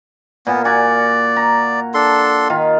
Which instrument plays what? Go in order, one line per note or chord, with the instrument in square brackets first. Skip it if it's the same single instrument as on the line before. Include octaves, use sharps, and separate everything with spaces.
[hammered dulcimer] A#2 [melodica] B3
[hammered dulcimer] F#4 G#5 [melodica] D5
[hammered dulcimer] A#5
[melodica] D4 A4 C6
[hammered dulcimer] D#3 F4